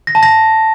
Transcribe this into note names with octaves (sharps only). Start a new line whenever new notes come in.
A#6
A5
A#6